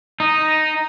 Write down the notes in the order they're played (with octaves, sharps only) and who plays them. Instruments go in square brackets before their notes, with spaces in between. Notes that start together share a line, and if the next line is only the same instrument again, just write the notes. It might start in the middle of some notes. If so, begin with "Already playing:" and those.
[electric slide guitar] D#4